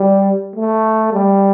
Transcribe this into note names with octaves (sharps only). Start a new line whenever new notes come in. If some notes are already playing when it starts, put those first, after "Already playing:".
Already playing: G3
A3
G3